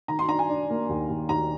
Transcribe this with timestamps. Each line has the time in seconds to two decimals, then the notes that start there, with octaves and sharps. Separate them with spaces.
0.08 D#3 A#5
0.19 C6
0.28 D4 A#5
0.39 G#5
0.49 D4
0.70 A#3
0.89 D#2
1.09 D#2
1.29 D#2 A#5